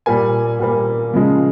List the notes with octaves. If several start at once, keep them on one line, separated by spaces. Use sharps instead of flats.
A#2 G3 A#3 G#5
A#2 G3 A#3
C#3 F3 G#3